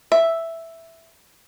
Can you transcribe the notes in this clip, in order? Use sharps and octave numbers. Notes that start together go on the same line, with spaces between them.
E5